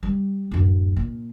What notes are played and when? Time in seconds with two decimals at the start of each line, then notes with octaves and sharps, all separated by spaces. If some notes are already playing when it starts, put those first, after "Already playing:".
0.03 G3
0.51 D1 F#2
0.96 A#2